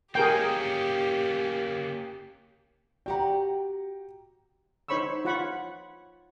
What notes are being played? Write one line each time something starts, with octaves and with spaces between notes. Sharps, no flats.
A#3 C#4 G4 G#4 A#4 G5
F#4 G4 F#5 G5 A#5
D#4 C5 C#5 B5 C#6 E6
F4 C#5 F#5 B5 C#6